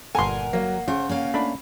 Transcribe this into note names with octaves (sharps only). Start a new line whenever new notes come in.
G1 A#2 A4 A#4 F#5 G#5 C6
F#3 A#3
C#3 C5
A#3 C#4 F5
A3 D4 B5